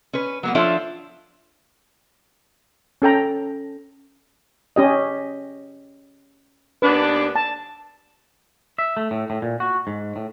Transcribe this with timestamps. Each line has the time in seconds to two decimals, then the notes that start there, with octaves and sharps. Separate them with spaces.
0.13 C#4 B4
0.43 F#3 A#3 B3
0.55 F3 D4 F4 A4 C#5 E5
3.02 C#4 A4 G5 A#5
4.76 C#4 G4 D#5
6.82 D#2 B3 D4 B4
7.35 A5
8.79 E5
8.97 A3
9.11 A2
9.30 A2
9.42 A#2
9.60 F#4
9.87 G#2
10.16 A2